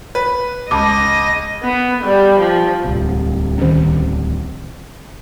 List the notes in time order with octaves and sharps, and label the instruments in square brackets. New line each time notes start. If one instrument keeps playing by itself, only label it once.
[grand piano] B4
[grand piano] C#2 [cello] D#5 [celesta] A5 D6
[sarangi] B3
G3
F3
[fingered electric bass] D1 C2 C3
[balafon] D#3 C#4